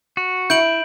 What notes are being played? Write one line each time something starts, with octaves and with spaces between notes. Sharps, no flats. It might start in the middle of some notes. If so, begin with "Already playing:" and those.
F#4
E4 G6 D7 F#7